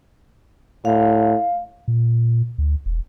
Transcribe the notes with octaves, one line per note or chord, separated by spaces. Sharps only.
A2 F5
A#2
D2
E1